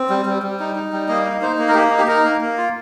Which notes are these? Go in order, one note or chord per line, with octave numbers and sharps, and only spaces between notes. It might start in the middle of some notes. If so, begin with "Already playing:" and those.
Already playing: C4
G3
G3
G3
D#4
D#4
G3
A#3 D#5
D#4
D#4 C5
A#3
A#4
A#3 G4
D#4
G4
D#4 A#4
A#3
A#3
F4